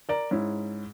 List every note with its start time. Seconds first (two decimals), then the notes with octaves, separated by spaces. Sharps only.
0.09 A#4 D5 A#5
0.31 G#2 C#4 E4